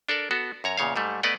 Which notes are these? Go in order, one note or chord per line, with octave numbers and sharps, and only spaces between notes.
D4 A4 A#4 D5
B3 F#4 A4
F#2 C#5 A#5
E2 A#2 C#3 C#5 F5
G#2 G3 A3
A3 B3 B4 D5 D#5 F#5